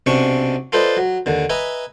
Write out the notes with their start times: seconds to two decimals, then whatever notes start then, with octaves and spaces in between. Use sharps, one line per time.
0.06 B1 C3 C#4 D4 C#6
0.72 F4 A4 B4 C5 D5 D#5
0.97 F#3
1.26 D#2 D3
1.50 B4 D#5 E5 G#5 A#5